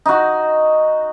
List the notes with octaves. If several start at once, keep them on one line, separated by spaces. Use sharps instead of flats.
D#4 F#4